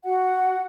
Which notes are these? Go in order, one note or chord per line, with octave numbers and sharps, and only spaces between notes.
F#4 F#5